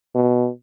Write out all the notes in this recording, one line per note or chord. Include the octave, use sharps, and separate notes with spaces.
B2